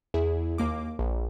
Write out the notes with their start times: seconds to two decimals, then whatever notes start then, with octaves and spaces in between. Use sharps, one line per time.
0.14 E2 E4 G#4
0.58 D#2 A#3 D6
0.99 A#1